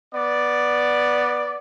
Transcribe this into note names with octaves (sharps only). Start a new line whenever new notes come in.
B3 D5